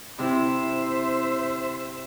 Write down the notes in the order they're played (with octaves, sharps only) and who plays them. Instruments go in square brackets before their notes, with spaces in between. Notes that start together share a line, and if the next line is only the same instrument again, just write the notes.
[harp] C3 E4 [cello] C5 E5